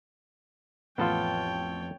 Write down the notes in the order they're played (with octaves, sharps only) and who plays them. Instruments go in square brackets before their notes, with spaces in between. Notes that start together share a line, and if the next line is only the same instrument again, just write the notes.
[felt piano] A1 [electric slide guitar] F2 A4 [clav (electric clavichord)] B3 F4 [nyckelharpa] C#5 G5